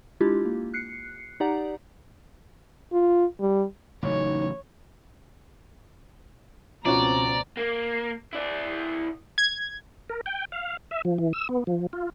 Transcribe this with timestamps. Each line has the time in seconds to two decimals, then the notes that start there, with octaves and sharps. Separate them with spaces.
0.20 G#3 D4 E4 F4 G4
0.45 A#3
0.74 F#6 C7 C#7
1.40 D#4 G4 D5 F#5 A#5
2.92 F4
3.40 G3
4.03 A1 C#3 F#3 D#4 C#5
6.85 C#2 B2 F3 C4 C#4 F#4 D5 A#5
7.57 A#3
8.33 E4 D5
9.38 G#6
10.10 A#4
10.26 G5
10.52 F5
10.91 E5
11.05 F3
11.18 E3
11.33 E6
11.49 B3
11.67 F3
11.93 F4